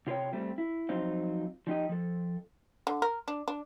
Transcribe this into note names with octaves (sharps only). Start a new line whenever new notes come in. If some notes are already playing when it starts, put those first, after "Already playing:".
C3 F4 B4 C#5 G5
G3 A3 C4
E4
F2 F3 F#3 C4 D#4 F4
F3 D#4 G4 D#5
F3 A4
D3
A#4
D4
D4